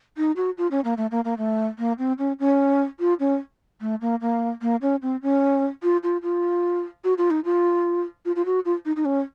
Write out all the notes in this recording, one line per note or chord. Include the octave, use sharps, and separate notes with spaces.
D#4
F#4
F4
C#4
A#3
A3
A#3
A#3
A3
A#3
C4
C#4
C#4
F4
C#4
A3
A#3
A#3
A#3
C#4
C4
C#4
F4
F4
F4
F#4
F4
D#4
F4
F4
F4
F#4
F4
D#4
D#4
C#4